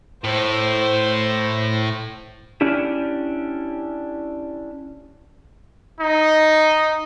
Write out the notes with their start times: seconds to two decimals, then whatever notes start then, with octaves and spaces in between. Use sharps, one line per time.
0.24 A2 C5
2.61 C#4 D4 E4 G4
6.00 D#4